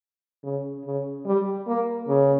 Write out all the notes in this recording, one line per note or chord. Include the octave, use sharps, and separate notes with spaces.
C#3
C#3
G3
A#3
C#3